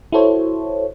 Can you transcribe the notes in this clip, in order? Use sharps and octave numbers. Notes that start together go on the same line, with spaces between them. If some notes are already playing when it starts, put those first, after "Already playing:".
E4 F#4 A4 C5 C#5